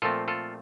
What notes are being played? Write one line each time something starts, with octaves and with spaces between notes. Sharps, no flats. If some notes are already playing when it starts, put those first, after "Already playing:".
A#2 F3 A3 C4 F4 A4
F4 A4